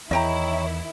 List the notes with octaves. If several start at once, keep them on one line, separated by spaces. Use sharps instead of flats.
E2 D#3 E4 C#5 D#5 G5 A#5